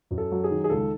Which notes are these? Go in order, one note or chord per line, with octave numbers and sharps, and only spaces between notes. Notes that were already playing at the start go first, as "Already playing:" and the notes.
F#2
A4
F#3
G#4
D#3
G#4
C#2 A4